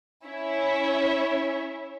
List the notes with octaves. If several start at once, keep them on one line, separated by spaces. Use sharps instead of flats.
C#4 E4 C#5 E5